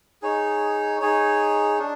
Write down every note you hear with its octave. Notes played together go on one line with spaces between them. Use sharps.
D#4 G#4 C#5
D#4 G#4 C#5
D4